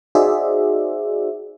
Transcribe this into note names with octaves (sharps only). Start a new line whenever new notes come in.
D#4 F#4 G#4 C5 D5 E5